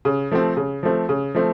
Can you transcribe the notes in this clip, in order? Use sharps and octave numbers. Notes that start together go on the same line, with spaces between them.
C#3
F3 A3 C4
C#3
F3 A3 C4
C#3
F3 A3 C4